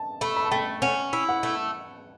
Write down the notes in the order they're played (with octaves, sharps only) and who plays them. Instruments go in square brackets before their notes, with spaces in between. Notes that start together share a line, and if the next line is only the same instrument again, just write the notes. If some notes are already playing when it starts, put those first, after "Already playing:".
Already playing: [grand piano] A5
[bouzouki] A3 [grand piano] B5
[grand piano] B5
A5
[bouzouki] A3 [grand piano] G5
[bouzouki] C#4 [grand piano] F#5
[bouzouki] E4
[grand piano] F#5
[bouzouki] A3